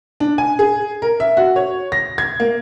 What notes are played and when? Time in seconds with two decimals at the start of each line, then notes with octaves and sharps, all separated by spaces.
0.20 D4
0.38 G#5
0.59 G#4
1.02 A#4
1.20 E5
1.37 F#4
1.56 C#5
1.92 A#6
2.18 G#6
2.40 A#3